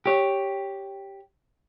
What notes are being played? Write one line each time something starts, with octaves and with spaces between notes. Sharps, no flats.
G4 C#5